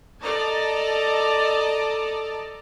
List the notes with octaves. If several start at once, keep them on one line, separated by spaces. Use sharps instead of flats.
A4 D5 D#5 A5 A#5